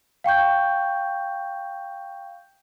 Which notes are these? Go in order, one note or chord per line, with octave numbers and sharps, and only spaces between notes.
F5 G5 C#6 G6